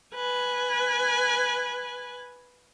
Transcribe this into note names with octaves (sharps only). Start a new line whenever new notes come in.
B4 G#5